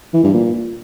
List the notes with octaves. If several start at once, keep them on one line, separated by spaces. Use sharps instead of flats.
E3
G2
A#2